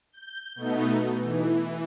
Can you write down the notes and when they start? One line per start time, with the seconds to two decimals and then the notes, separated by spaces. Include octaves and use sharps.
0.12 G6
0.55 B2 A3 B3 D#4
1.14 E3